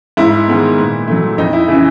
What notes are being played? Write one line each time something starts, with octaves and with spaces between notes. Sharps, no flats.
G#2 E4
D#3 G#3 B3
A#2
F#3 A3
F2 D#4
E4
C#3 E3 E4